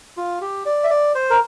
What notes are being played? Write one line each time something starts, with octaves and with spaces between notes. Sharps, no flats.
F4
G4
D5
E5
D5
C5
A#4